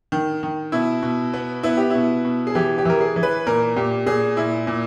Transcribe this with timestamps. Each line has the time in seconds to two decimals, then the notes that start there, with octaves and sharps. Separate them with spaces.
0.12 D#3
0.43 D#3
0.72 B2 E4
1.03 B2
1.33 B3
1.63 B3 E4
1.77 G4
1.90 B2 E4
2.25 B2
2.47 G#4
2.55 E3 G4
2.78 G4
2.85 E3 A#4
3.01 G#4
3.16 E3
3.23 B4
3.47 A#2 A#4
3.76 A#2 G4
4.06 A#2 G#4
4.37 A#2 E4
4.67 A#2